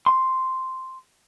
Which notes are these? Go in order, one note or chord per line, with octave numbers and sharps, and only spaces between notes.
C6